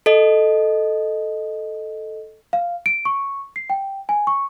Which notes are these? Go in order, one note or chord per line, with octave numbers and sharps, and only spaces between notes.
A4 D#5
F5
D7
C#6
C7
G5
G#5
C#6